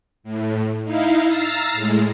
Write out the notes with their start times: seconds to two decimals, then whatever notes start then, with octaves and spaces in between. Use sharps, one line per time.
0.24 A2
0.84 D#4 E4 F5
1.25 A#5 E6 F6 A6 A#6 C7
1.73 A2 G#3